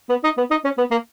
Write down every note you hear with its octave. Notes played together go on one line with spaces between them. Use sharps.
B3
D#4
B3
D#4
C#4
B3
A#3